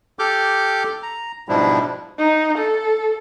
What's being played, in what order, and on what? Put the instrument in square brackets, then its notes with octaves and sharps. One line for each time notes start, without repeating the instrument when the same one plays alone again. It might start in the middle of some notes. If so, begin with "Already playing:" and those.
[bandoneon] G4 A4 D6 F6 G6
A#5
G#2 B2 F3 G3 D4 E4
[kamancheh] D#4
A4